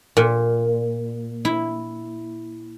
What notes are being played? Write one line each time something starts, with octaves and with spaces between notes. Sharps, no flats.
A#2
E4